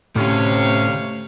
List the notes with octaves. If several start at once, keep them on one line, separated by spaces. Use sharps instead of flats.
D2 A2 C3 A3 C#4 C#5 F5